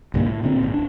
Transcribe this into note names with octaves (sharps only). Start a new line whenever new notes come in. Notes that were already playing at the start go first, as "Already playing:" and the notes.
B1 G2 D3 A#3
A2
A#2 D3 C4
G#1 A#2
D1 D4